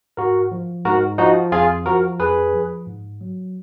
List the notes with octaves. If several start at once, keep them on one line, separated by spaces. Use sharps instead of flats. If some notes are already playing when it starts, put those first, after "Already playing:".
G#2 F#4 A#4
F3
G#2 F#4 A#4
F3 D#4 F#4
F2 F4 G#4
F3 F#4 A#4
F2 G#4 B4
F3
G#2
F#3